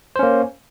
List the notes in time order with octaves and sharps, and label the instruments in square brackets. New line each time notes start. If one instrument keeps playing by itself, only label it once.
[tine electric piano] C5
C#4
A#3